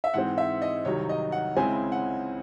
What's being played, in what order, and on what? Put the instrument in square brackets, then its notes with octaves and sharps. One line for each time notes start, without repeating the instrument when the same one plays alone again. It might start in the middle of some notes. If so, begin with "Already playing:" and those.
[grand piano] E5
G#2 E3 G#3 C4 F#5
E5
D#5
C2 C3 D#3 F#3 C#5
D#5
F#5
C#2 C#3 G#3 C4 E4 G#5
F#5